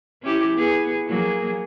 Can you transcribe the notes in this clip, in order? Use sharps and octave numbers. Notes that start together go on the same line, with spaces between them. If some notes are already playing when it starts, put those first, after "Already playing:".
C#4 E4 G4
B3 G#4
F#3 A#3 G#4